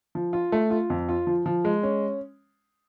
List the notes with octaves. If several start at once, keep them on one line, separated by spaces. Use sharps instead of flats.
F3
F4
A3
F4
F2
F4
F3
F3
G#3
C#4